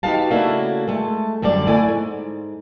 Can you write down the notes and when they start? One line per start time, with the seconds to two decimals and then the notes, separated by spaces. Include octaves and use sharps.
0.03 D#4 F#4 G4 B4 F5 A5
0.30 C#3 A3 A#3 D4 E4 F#4
0.88 G#3 A3 A5
1.42 F#2 D3 G3 D4 D5
1.67 A3 E4 D5 F#5 G#5
1.88 G#2